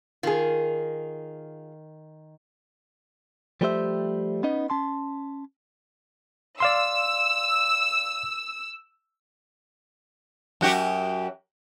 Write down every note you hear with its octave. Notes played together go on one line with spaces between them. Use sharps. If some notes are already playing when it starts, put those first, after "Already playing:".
D#3 F4 G#4
F3 G3 A3 G4 C5 E5
B3 C#4 D#4 D#5
C#4 A5 C6
D5 F5 C6 E6
F#2 F#4 G4